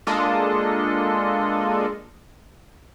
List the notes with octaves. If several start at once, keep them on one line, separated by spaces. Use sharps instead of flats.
G#3 A#3 D4 F4 A4 D#5